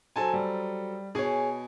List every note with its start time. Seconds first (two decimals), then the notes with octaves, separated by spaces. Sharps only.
0.16 F#3 A4 C5 G#5 A5
0.33 G3
1.15 B2 G#4 C#5 G#5